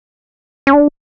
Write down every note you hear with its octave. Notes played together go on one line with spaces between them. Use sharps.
C#4
D4